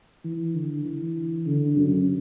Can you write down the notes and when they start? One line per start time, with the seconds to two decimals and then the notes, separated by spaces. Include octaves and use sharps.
0.25 E3
0.54 D3
0.85 E3
1.46 D3
1.77 F#2